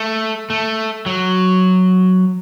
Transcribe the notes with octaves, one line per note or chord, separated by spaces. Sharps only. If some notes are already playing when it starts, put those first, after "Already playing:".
Already playing: A3
A3
F#3